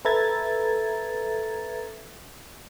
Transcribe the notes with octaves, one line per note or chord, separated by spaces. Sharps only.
A4 B4 E5 A#5 G#6 A6